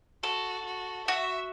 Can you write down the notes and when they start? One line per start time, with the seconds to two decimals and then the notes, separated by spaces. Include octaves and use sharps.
0.23 F#4 A4
0.66 F#4
1.08 F#4 E5